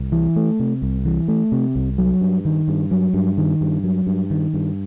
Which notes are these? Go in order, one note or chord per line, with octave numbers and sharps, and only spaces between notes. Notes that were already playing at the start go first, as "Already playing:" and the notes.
Already playing: C2
E3
A3
C3
C2
E3
A3
C3
C2
F#3
G2
D#3
G2
F#3
G2
D#3
G2
F#3
G2
D#3
G2